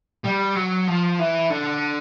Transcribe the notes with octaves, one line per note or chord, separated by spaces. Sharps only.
G3
F#3
F3
E3
D3